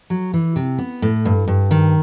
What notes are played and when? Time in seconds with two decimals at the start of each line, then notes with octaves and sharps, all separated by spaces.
0.10 F#3
0.34 E3
0.56 C3
0.78 B3
1.02 A2
1.25 G2
1.48 G2
1.71 D#3